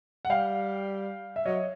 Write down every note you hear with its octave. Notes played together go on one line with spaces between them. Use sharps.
F#5
G3 F5 G5
E5
F#3 C#5 D#5